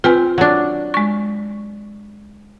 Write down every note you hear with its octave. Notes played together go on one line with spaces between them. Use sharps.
C4 F4 B4 G#5
F#3 D4
G#3 C#6